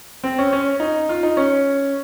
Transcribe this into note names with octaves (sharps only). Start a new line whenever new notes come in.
C4
C#4
C#4
D#4
F4
D#4
C#4